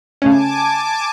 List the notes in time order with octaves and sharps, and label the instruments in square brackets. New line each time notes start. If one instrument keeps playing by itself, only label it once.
[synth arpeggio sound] C#3 A3 C#4 [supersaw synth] G#5 A5 D6